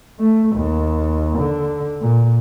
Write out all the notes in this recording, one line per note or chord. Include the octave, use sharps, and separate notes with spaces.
A3
D#2
D3
A#2